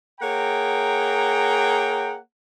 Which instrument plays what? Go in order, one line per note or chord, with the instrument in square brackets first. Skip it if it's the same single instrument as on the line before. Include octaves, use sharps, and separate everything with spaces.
[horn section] A#3 G#4 C#5 F#5 G5 A#5